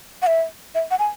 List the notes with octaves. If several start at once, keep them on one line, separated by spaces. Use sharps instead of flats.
F#5
E5
E5
F#5
G#5